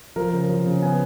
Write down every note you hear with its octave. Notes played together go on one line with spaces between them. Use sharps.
F3 A#4
C#3
F3
C#3
B3 G#5